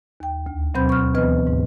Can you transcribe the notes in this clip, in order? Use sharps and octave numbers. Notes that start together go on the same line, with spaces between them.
D#2 G5
D2
B2 F#3 C4 C5 B5 G6
C#6 F6
D2 E3 B3 B4 D#5 F6
G#2